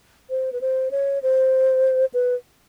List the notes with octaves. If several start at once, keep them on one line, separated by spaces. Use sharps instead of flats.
C5
B4
C5
C#5
C5
B4